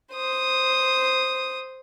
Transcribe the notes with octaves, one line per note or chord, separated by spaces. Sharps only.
C5 D#6